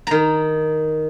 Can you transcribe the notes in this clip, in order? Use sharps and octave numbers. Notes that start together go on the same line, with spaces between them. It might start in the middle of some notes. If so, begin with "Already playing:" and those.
D#3 A#5